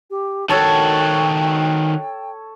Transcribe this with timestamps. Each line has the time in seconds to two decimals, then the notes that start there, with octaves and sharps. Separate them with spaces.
0.11 G4
0.49 D#3 F#4 A4 C#5 G5 A5